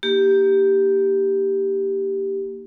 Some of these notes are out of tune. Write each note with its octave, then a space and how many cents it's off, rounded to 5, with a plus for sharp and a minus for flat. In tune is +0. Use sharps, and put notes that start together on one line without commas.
A#3 +0 D#4 +0 G4 +0